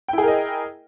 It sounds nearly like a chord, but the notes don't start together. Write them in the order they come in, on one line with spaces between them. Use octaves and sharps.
G5 E4 G#4 A#4 D#5